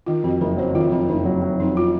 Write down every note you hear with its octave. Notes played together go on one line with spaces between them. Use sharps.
D#3 F4
F2 F#4
F#1 A#4
F#3 C5
D#3 F4
F2 F4
F#1 D#4
F#3
F#3
F2 D#4
F4